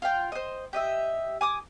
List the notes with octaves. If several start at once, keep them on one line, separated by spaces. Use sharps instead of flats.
F4 F5 G5
C5 D#5
G4 D#5 E5
G#5 D6 D#6